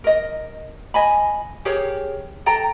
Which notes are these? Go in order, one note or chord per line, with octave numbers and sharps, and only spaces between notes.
A#4 D#5
D#5 G#5 B5
G4 G#4 A#4 C#5
A4 G5 A#5